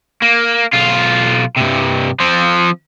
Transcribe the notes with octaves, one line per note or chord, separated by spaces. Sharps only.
A#3
B1 F4
G2 C3
F3 C4